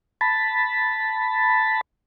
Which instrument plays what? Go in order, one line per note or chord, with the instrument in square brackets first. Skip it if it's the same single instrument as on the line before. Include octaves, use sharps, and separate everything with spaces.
[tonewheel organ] A5 B5